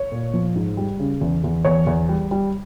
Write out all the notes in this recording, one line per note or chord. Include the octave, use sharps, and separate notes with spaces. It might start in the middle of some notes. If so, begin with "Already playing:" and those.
Already playing: C#5
A#2
F3
G#2
G3
C#3
E2
E2
E2 C#5
E2
G3
G3